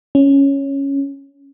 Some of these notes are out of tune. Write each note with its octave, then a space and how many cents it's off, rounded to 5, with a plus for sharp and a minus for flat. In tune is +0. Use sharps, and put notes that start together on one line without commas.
C#4 +0